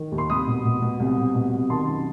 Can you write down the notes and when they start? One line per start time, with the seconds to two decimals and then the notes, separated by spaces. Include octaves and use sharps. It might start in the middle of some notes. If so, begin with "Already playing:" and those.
Already playing: D#3
0.12 D#2
0.18 C6
0.30 C2 B5 D#6
0.47 B2
0.65 B2
0.82 B2
1.00 C2
1.17 C2
1.35 B2
1.53 C2
1.70 D#3 A5 C6
1.88 F#2